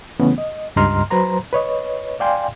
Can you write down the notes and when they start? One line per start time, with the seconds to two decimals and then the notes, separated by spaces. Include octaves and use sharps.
0.19 C#3 E3 A3 B3 C#4
0.38 D#5
0.76 C#2 G2 D#5 A#5 C6 F6
1.10 F#3 B4 C5 A#5 C6
1.53 B4 C#5 D#5
2.20 D5 F5 G5 G#5 C6